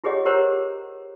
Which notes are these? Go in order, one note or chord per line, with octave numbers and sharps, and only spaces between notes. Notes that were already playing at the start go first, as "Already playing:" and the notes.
F4 G4 G#4 C#5 D#5 F#5
G4 A#4 C5 C#5 F#5 A#5